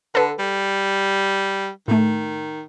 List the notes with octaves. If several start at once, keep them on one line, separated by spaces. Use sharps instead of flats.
D3 A4 B4
G3
A2 D#3 A3